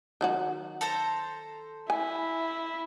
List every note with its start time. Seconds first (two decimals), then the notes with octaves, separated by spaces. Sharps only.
0.21 D#3 F#3 F#4
0.81 A4 C5 A#5
1.90 E4 G#5